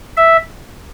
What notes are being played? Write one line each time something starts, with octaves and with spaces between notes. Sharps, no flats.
E5